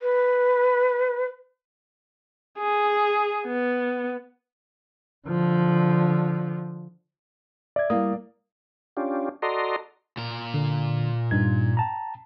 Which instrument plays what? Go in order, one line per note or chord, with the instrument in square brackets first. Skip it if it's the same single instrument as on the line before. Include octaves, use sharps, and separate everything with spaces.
[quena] B4
[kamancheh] G#4
B3
[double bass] D3 F3
[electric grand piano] D5 [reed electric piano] E5 G#6
[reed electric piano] G3 E4 D#6 [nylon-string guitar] A#3
[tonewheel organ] C#4 D4 F4 G4
F#4 A4 D5 D#5 A#5 C6
[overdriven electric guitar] A#2 A#4
[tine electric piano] D3
G2 D#4 G#6
G5 A5 A#5